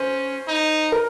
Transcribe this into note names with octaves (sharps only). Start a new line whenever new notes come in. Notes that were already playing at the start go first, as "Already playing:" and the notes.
Already playing: C#4 C5
D#4
A#4